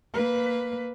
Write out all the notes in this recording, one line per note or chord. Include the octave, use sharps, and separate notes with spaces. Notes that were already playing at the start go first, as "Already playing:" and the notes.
A#3 B4